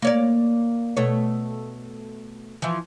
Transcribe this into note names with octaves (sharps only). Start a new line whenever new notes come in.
A#3 C#5 D5
B2 A3 C#5
E3 F3